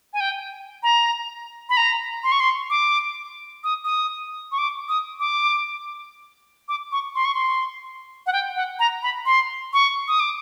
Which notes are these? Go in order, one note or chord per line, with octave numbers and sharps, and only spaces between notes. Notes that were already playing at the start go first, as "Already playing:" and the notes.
G#5
G5
A#5
B5
A#5
C6
C#6
C6
D6
D#6
D#6
C#6
D6
D#6
D6
D6
C#6
C6
C#6
C6
F#5
G5
F#5
A#5
B5
C6
C#6
D#6
D6